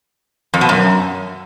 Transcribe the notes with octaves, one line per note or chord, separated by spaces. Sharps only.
F2
B2
F#2